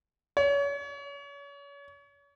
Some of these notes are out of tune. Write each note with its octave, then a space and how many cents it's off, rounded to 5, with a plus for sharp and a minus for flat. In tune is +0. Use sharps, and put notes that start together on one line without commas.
C#5 +35